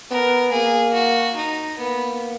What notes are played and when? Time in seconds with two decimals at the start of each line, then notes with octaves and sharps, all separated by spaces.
0.10 B3 A#4
0.52 A#3 G#4
0.93 F#4
1.36 D#4
1.78 A#3 B3